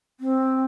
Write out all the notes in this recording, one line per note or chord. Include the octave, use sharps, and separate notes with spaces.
C4